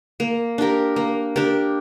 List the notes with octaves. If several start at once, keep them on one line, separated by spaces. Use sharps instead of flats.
A#3
D4 G4 A#4
A#3
D4 G4 A#4